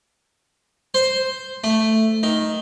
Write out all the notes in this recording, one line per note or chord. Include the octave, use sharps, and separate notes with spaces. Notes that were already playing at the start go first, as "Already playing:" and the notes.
C5
A3
D#3